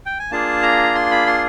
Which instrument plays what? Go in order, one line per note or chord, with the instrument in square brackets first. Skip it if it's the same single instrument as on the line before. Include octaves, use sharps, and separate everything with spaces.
[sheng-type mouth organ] G5
G#5
A#3 D4 F4 G#4 A5
A#5
C6
B5
C6